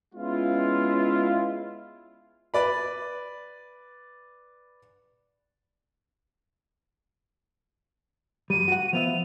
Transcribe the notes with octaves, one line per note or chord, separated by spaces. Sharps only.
G#3 B3 C#4 E4 F4
B4 D5 B5
F#2 G3 D#7
F#4 F#5
F3 B3 E5 F7